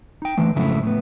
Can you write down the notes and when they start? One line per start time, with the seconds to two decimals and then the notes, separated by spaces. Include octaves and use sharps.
0.22 D#4 G5
0.37 D3 E3 A3
0.56 F2 G#2 C#3 F#3 A3 E4
0.83 A2 B3